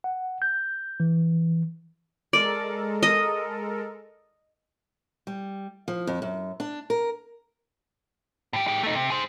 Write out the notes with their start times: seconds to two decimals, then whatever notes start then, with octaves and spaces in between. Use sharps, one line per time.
0.04 F#5
0.42 G6
1.00 E3
2.33 G#3 A4 A#4 D5
3.03 D#5
5.27 G3
5.88 F3
6.07 F2
6.22 F#2
6.60 D4
6.90 A#4
8.53 A2 G4
8.68 G#3 G4
8.83 A3 D#4
8.95 C3
9.10 G#4 C5